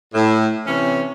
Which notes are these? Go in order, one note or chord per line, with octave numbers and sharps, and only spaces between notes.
A2
C3 E3 C#4